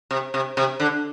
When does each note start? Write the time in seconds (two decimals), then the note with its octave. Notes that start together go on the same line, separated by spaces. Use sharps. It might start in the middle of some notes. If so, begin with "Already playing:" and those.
0.11 C3
0.34 C3
0.57 C3
0.80 D3